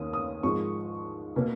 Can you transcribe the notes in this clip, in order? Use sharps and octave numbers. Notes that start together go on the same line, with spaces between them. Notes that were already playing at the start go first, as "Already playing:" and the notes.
Already playing: D#2 D#3 A#3 C#4 D#6
D#6
G#2 F3 G#3 C#6
B2 A#3